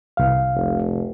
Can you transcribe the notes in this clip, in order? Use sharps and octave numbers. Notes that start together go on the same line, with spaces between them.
C2 F5
F1